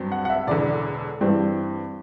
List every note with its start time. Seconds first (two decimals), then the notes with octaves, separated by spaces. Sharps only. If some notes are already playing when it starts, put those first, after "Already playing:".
Already playing: G2 F#3 C4
0.12 F#5
0.25 F#5
0.30 E5
0.47 E1 E2 D3 D5
1.21 G2 E3 G3 C4